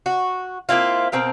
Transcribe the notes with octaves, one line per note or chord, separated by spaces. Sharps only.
F#4
A#3 C4 E4 F4
B2 C4 A#4 F5